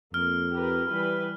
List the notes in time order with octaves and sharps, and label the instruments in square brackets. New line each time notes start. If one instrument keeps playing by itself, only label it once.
[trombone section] F2 [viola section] A#3 [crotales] F6
[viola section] G4 A#4 B4
E3 G3 B4